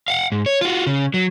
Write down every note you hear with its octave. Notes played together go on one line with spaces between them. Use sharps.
F5 F#5
G#2
C#5
F4 F#4
C#3
F#3